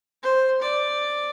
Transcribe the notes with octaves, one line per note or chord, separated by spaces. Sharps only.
C5
D5